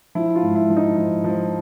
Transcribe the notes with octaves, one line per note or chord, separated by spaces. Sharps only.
F3 E4
F4
G#2
E4
F3
D#4
F3
F3